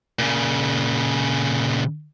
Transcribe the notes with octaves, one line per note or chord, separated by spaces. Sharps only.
A#2 C#3